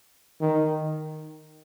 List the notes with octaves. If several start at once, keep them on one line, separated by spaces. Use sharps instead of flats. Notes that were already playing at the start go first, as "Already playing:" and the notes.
D#3